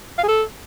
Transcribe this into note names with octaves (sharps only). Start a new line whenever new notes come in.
F5
G#4
A4